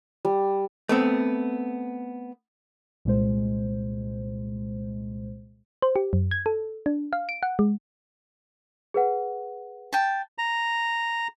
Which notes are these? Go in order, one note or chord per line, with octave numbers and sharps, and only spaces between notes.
G3
A3 B3 C4
C2 A#2 G#3 C5
C5
G4
F#2
G#6
A4
D4
F5
D7
F#5
G#3
G#4 B4 F#5
G5 A5
A#5